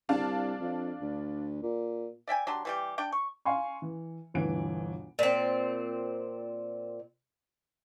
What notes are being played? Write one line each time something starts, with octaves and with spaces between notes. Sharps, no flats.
C2 D4 F5 A5
F2
D2
A#2
D5 E5 G5 G#5
F#3 D4 G4 C6
E3 G3 G4
D4 G5
C#6
F5 G#5 C6 C#6
E3
G1 D2 B2 E3 D7
A#2 C4